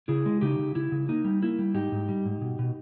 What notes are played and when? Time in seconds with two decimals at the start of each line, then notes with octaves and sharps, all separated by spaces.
0.08 C#3 E4 G#4
0.26 G#3
0.41 C#3 D#4 G4
0.59 C#3
0.75 C#3 E4
0.92 C#3
1.09 A#3 D#4
1.24 G3
1.42 A#3 E4
1.59 G3
1.74 G#2 D#4 G4
1.92 G#2
2.09 G3
2.26 G#2
2.41 B2
2.59 B2